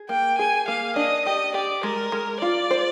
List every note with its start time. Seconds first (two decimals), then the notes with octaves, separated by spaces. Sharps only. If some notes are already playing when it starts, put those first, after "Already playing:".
Already playing: G#4
0.09 A#3 G5
0.38 G#4 G#5
0.68 A#3 F5
0.96 D4 D#5
1.25 G4 D#5
1.54 G4 D5
1.83 G#3 A#4
2.12 G#3
2.41 F4 D5
2.71 C5